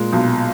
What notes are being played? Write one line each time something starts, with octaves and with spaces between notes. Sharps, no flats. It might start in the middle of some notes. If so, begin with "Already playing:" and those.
Already playing: A#2 G#3
B1